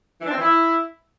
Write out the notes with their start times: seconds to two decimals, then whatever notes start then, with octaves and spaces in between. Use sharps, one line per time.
0.21 E3
0.26 D4
0.31 C4
0.36 E3
0.41 E4